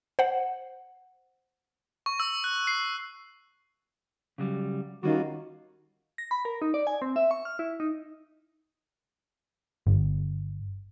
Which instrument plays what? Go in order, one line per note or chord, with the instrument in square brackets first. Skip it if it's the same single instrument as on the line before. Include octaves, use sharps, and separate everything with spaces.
[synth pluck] C5 F#5
[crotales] C#6
E6
F#6
C7
[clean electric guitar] C#3 F#3 G3
[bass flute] D#3 [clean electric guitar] G3 C#4 F4 [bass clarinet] F#4
[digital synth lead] A#6
B5
A#4
D#4
D5
G#5
C4
E5
C#6
F6
E4
D#4
[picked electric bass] G1